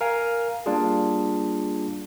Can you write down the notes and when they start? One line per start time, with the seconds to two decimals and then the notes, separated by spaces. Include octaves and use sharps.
0.01 A#4 F5 G#5
0.66 G3 A#3 D4 F4 G#4